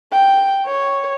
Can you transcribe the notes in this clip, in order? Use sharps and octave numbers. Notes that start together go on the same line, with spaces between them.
G5
C#5